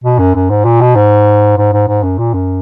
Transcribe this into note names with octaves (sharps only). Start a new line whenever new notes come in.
B2
F#2
F#2
G#2
A#2
B2
G#2
G#2
G#2
G#2
F#2
A#2
F#2